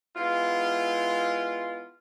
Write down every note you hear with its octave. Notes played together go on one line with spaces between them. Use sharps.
G#3 B3 E4 F4